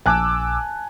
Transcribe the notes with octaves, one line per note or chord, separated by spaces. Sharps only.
A#1 G#5 A5 D6 E6 F#6